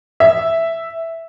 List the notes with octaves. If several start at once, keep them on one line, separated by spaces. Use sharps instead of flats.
E5